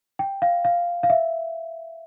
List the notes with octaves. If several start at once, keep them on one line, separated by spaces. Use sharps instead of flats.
G5
F5
F5
F5
E5